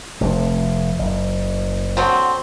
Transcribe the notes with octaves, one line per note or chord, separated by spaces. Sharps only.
F1 F2
F#1
D3 F#3 C4